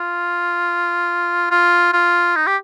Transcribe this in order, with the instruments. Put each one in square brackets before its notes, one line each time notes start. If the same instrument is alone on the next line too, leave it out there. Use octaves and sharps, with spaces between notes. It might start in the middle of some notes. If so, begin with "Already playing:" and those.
Already playing: [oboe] F4
F4
F4
D#4
G4